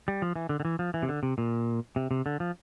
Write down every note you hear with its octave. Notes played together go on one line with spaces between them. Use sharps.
G3
F3
E3
D3
D3
E3
F3
E3
C3
D3
C3
A#2
C3
C3
D3
F3